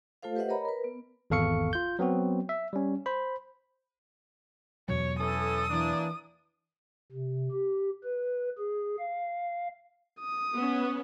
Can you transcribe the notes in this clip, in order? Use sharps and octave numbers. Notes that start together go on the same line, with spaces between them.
A3 F4 A4 C5 F5
G4 B4 C5 D#5 E5 F#5
A#4 C#5 D#5 A#5 B5
A#4 B4
B3
G#1 E2 A4 F5 C#6 C#7
F4 G6
F#3 B3 C4 F#4
E5
G3 C#4
C5 B5
E2 B2 F#3 C#5
E3 C#4 A4 D#6
E3 A#3 D4
C3
G4
B4
G#4
F5
D#6
B3 C#4